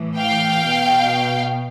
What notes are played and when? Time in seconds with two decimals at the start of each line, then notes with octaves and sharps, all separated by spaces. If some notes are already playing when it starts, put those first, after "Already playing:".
Already playing: A2 E3
0.18 F5 G5
0.64 B2